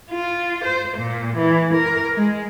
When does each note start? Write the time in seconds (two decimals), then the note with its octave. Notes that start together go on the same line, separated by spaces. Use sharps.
0.10 F4
0.64 C5
0.97 A#2
1.36 E3
1.73 A#4
2.15 G#3